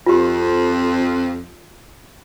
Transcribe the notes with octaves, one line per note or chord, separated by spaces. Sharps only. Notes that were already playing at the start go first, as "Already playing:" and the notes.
F2 F4 G4